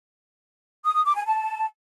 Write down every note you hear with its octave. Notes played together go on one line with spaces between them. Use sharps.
D#6
D#6
D6
G#5
A5